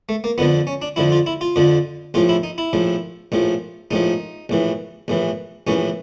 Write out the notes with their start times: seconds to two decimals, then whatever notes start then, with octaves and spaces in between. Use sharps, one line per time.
0.09 A3
0.24 A#3
0.38 F2 D3 F3 B3
0.67 C#4
0.82 D4
0.96 F2 D3 F3 E4
1.12 F4
1.26 E4
1.41 F4
1.56 F2 D3 F3
2.14 A#1 A2 F3 F4
2.29 E4
2.43 D#4
2.58 E4
2.73 A#1 A2 F3
3.32 A#1 A2 F3
3.91 A#1 A2 F3 D#4
4.49 A#1 A2 E3
5.08 A#1 A2 E3
5.67 A#1 A2 E3 C#4